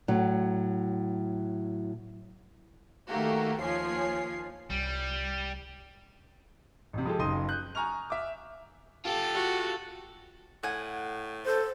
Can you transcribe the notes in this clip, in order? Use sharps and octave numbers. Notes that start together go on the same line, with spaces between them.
A2 F#3
D#3 A3 A#3 F#4 G4
D#2 F3 C#5 G#5 C7
C2 G3
A1 C3
F3 G#3 G4 A4
F#1 D#4 C6 D#6 D#7
F#6 G6
G#5 A#5 C#6 F6 F7
E5 D6
F4 G4 A4
F#4
A2 F#5 G#5
A4 C5